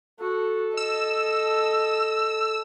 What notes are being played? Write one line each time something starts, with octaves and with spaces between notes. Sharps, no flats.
F#4 A4
D#5 E6